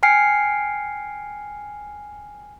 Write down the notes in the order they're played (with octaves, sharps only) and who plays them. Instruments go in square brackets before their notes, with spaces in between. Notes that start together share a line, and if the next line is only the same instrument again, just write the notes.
[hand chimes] G5 G#5 F6 C7 C#7